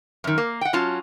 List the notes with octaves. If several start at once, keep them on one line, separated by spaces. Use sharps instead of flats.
F#2 D#3
A#3
F#5 G5
F#3 C#4 F4 A5